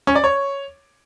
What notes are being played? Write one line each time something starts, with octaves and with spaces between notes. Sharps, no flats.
C#4
D5
C#5